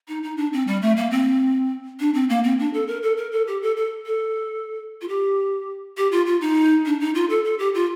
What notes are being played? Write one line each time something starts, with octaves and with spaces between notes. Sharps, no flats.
D#4
D#4
D4
C4
G3
A3
A#3
C4
D4
C4
A#3
C4
D4
A4
A#4
A4
A#4
A4
G4
A4
A4
A4
F4
G4
G4
F4
F4
D#4
D4
D#4
F4
A4
A4
G4
F4